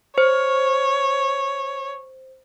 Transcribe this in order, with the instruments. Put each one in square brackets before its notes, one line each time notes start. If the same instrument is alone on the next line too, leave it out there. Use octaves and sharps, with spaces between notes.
[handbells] C5 [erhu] C#5